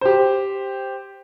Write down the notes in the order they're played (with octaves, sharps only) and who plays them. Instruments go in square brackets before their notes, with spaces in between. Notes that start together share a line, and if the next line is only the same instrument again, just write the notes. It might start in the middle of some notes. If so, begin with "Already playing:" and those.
[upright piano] G4 C5